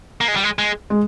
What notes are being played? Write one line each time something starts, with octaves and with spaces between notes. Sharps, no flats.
A#3
G#3
G3
G#3
G#3
G#3